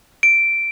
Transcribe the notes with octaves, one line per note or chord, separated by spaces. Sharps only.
D7